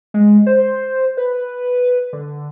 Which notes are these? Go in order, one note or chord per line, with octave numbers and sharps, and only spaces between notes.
G#3
C5
B4
D3